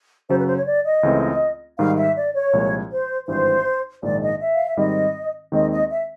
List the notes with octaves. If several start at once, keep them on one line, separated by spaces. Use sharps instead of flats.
F#2 C#3 F#3 C5
B4
C5
C#5
D5
D#5
C#2 C#3 E3 A3 C4
G#2 D#3 G3 F5
E5
D5
C#5
C2 A#2 F3 G#3
C5
G#1 G2 E3 C5
A#1 G#2 D#3 G#3 D5
D#5
E5
F5
E5
G#2 D#3 G3 C4 D#5
D#2 D#3 G#3 C4 D#5
D#5
E5